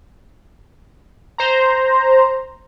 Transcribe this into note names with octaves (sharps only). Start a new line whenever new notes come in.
C5 A#5